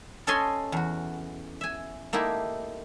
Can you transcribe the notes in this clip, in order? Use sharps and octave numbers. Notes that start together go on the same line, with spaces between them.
C#4 A4 C#5 D#5 G#5 C6
E2 F#4
E5 G#5
A3 A#3 D#4 E4 G4